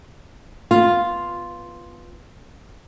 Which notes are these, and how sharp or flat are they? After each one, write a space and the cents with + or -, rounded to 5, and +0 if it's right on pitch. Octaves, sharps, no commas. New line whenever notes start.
B3 -5 F4 +0